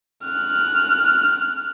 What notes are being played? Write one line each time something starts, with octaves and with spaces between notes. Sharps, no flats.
F6 F#6